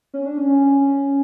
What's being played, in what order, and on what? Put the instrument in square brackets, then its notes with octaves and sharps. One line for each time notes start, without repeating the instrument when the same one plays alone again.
[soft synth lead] C#4
D4
C#4